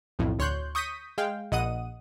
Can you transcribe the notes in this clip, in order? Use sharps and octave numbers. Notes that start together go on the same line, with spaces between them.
B1 F2 A2
D2 C#5 C6 F#6 G6
C#6 D#6 G6 A#6 B6 D#7
G#3 F5 G5
A#1 D#5 F#5 D#6 D#7